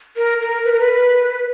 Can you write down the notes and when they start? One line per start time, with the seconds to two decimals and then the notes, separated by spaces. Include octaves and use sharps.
0.17 A#4
0.41 A#4
0.65 B4
0.72 A#4
0.80 B4